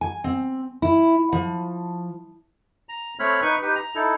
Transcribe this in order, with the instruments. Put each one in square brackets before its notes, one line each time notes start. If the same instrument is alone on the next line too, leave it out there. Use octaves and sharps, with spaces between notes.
[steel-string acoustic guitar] G#5
C4
E4
F3
[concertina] A#5
A3 C4 C#5 B5 F6
D#4 B4 C#6
D#4 G4 B4
A#5
D#4 E4 A4